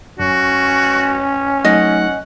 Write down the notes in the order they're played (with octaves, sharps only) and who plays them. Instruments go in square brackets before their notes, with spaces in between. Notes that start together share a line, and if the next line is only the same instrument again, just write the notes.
[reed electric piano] F#2 [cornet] C#4 [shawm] F#4
[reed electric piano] F#3 A3 D#4 [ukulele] D#5 [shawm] F#5